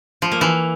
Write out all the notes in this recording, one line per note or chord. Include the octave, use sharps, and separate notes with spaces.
F3
A#3
E3